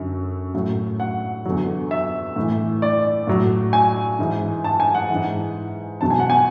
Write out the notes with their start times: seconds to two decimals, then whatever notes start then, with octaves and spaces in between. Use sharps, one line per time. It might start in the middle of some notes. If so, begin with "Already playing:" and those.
Already playing: F#2 D3 F#3
0.54 A2 F#3
1.00 F#5
1.45 E2 D3 F#3
1.91 E5
2.36 A2 E3
2.82 D5
3.27 A2 F#3
3.73 G#5
4.19 G#2 E3
4.64 A5
4.80 G#5
4.94 F#5
5.10 G#2 E3
6.01 E2 B2 F#3 A5
6.10 G#5
6.19 F#5
6.30 G#5